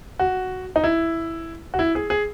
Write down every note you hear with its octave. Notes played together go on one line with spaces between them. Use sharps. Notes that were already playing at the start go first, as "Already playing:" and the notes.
F#4
D#4
E4
F#4
E4
G#4
G#4